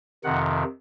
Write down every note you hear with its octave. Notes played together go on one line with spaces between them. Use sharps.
F2 C3 D#3 F#5